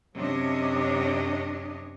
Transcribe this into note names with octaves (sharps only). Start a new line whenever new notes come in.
F#2 C3 C#4 D4 C#5 D#5